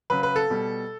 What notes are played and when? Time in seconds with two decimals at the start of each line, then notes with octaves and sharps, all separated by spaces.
0.10 C#3 F#3 B4
0.23 B4
0.36 A4
0.50 B2 G3